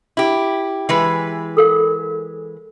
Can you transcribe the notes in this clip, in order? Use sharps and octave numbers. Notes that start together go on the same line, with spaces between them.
E4 G4
E3 G#3 B4
A4 A#4 F5